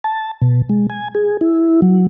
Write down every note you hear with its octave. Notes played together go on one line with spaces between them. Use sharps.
A5
B2
G#3
G#5
G#4
E4
F#3